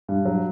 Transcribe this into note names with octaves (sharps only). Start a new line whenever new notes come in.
G2
F#3